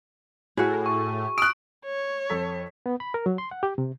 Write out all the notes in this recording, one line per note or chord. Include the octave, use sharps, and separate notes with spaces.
A2 F#4 G#4
C#6
D#6 F6 F#6 D7
C#5
F2 A4 B6
B3
B5
A#4
F#3
C6
F#5
G4
C3